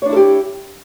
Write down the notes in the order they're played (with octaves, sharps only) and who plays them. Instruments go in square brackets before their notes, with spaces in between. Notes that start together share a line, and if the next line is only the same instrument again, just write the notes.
[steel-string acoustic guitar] C#5
D4
E4
A4
G4